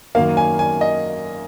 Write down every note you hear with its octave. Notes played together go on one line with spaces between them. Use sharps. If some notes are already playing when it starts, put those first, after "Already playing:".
F#2 D#3 A#3 F5
G#5
G#5
D#5